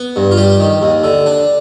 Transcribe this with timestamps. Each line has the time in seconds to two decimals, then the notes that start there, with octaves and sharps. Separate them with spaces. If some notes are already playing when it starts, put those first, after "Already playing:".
Already playing: B3
0.16 G2
0.31 F4
0.37 G3 G4
0.60 D#3
0.82 D#2
1.04 D3
1.26 D4